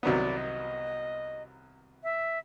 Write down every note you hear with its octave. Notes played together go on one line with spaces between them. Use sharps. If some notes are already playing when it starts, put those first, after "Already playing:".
C2 C3 D#3 F#3 B3 D5
D#5
E5